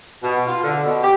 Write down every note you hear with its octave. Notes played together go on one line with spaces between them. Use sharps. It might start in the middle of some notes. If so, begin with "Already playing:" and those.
B2
F4
D3
B2
G4